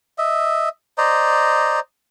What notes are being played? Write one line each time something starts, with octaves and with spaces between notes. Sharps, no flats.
D#5 E5
C5 D5 D#5 A#5